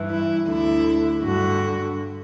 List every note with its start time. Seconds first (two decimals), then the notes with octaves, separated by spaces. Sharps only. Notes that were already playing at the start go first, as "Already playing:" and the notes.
Already playing: G2 E3
0.08 E4
0.46 D2 D3 E4
1.22 G2 D3 F#4